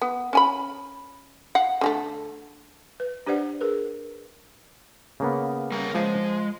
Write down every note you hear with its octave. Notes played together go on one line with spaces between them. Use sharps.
B3
C#4 G#5 B5
F5 F#5
D3 G#3 A3
B4
D4 G4 B4 C5 D5 F#5
G#4 A#4 B4
C#3 A#3 B3
G3 A#4
F3 G#3